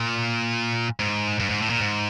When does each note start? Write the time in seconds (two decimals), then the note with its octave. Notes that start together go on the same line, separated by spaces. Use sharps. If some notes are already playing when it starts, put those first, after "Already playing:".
Already playing: A#2
0.99 G#2
1.40 G2
1.50 G#2
1.61 A2
1.70 A#2
1.80 G#2